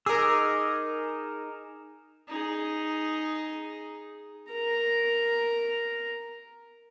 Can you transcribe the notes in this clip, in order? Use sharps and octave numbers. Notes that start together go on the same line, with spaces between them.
D#4 G#4 A#4 D6 E6
D#4 G#4
A#4 A#5